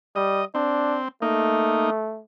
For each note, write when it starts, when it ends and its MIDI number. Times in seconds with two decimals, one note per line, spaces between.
0.16 0.43 55
0.16 0.45 75
0.55 1.08 60
0.55 1.00 62
1.22 2.22 57
1.22 1.90 58
1.22 1.90 63